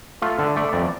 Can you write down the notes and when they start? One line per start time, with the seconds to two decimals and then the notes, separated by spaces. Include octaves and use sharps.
0.22 A3 F4
0.39 D3 A4
0.56 A3 D5
0.73 F2 D5